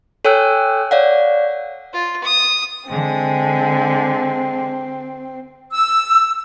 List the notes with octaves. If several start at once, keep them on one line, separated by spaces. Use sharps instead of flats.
A4 C#5 G5 G#5 E6 F#6
C#5 D5 F5 F#5
F4
D#6
D3 G#3 C4
E6